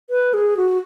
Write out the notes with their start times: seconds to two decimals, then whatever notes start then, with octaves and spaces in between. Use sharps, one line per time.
0.10 B4
0.34 G#4
0.57 F#4